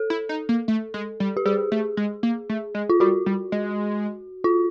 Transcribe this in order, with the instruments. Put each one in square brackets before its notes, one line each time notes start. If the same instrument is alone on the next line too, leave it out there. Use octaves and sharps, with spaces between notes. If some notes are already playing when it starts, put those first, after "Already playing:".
Already playing: [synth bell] A4
[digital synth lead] E4
D#4
A#3
A3
G#3
G3
[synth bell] G4
[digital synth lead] G3 [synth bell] G#4
[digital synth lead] A3
G#3
A#3
A3
G#3
[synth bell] F4
[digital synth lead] G3 [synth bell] F#4
[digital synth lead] G3
G#3
[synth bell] F4